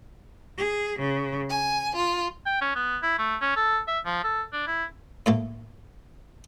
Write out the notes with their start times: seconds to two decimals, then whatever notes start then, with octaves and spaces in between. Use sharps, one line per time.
0.57 G#4
0.99 C#3
1.47 G#5
1.94 F4
2.46 G5
2.61 C#4
2.75 B3
3.03 E4
3.18 A3
3.42 C#4
3.56 A4
3.88 E5
4.06 F3
4.24 A4
4.53 D4
4.67 E4
5.26 A2 A3 A#3